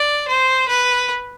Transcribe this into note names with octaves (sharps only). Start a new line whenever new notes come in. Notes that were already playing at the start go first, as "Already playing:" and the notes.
Already playing: D5
C5
B4